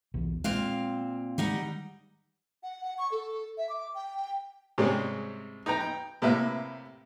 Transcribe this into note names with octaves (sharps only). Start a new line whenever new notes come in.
B1 E2
A#2 G#3 C4 F5
D#3 G3 G#3 D#4 F#5
F#5
F#5
C#6
A4
E5
D6
G5
G#2 C3 G3 G#3 C4 C#4
D#4 B4 G5 A#5
G5
A2 C3 A#3 B4 E5